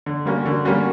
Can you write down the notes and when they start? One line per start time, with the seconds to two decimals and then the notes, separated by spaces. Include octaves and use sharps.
0.06 D3
0.26 G3 A#3 C#4 F#4
0.46 D3
0.65 G3 A#3 C#4 F#4